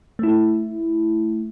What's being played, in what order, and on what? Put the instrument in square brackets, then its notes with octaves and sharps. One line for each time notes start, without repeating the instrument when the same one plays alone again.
[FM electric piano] A3 E4